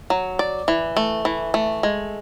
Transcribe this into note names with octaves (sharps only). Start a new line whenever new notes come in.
F#3
D5
E3
A3
E3
A3
G#3